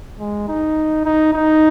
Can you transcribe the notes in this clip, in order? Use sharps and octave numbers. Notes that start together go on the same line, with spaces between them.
G#3
D#4
D#4
D#4